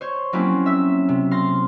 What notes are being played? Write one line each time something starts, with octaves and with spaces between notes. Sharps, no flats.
C5 C#5
F#3 A#3 C4 C#4 E4 F4
E5 E6
C3
F5 C6 A#6